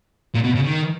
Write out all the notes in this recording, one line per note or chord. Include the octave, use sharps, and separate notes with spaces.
A#2
B2
C#3
D#3